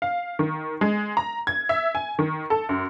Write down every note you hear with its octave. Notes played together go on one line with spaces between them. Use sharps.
F5
D#3
G#3
A#5
G#6
E5
G#5
D#3
A4
F#2